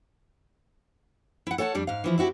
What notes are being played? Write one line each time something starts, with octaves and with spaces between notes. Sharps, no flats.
E4 F#5
A4 C#5 F#5 G#5 A5
F2 G3 D4
G#2 F5
E3 F3 E4
C4 E4 F#4 G4